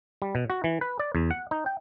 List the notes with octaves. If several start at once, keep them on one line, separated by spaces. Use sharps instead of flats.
G3
B2
F#4
E3
B4
D5
E2
F#5
D#4
G5